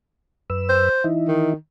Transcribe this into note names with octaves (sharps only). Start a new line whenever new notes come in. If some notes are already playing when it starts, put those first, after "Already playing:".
F#2 B4 E6
C5
E3 D#4 E4
D#3